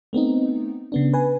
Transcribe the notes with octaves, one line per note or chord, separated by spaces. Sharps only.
A3 B3 C4 D#4
C#3 B3 D4
B4 G#5